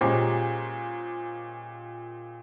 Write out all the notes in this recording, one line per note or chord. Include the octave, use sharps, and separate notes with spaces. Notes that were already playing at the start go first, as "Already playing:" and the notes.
A#2 G#3 C#4 G4 C5